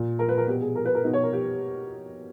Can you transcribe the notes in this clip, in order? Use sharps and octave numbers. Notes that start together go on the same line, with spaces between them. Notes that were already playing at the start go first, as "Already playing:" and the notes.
Already playing: A#2
A#4
B4
A#4
B2 G4
G#4
A#4
B4
A#4
B2 D#4
C#5
A#4
G4